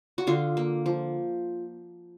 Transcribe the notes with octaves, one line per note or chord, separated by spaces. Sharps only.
F#4
D3 F4
A#3
F3